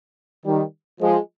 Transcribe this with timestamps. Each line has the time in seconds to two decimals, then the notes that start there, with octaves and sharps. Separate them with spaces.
0.46 D#3 G3
1.01 F3 G#3